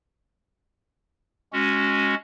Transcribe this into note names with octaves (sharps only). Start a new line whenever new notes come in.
G#3 C#4 F#4